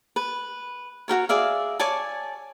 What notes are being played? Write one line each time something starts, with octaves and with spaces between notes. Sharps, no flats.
B4
F#4 G4 A#4 C#5
G#4 D5 E5 F5
C#5 D5 G#5 A5